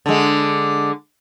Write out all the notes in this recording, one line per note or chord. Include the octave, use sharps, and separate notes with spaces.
D3 G#3